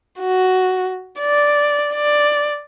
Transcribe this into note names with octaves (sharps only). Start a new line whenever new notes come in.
F#4
D5
D5